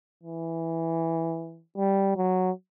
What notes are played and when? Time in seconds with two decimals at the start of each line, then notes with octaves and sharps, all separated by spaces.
0.23 E3
1.77 G3
2.16 F#3